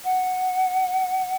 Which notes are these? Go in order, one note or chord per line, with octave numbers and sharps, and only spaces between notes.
F#5